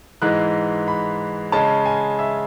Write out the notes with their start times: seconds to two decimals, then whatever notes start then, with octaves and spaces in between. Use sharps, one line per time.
0.22 G#2 E3 G#3 F#6
0.88 B5
1.52 C#3 G#3 C#4 A5
1.86 G#5
2.19 E5